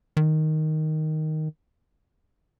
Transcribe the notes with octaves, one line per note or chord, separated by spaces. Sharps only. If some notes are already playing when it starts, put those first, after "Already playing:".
D#3